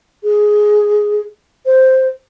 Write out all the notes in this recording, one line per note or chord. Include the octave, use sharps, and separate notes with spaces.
G#4
C5